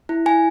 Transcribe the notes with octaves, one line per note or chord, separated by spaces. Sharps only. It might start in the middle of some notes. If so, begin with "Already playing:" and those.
E4
E4 G#5